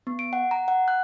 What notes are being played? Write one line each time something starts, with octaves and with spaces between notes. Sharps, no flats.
B3
D7
F#5
A#5
F#5
F#6